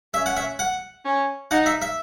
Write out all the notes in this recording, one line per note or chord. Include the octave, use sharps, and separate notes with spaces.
C#4 E5
F#5
E5
F#5
C#4
D#4 F#5
E5
E5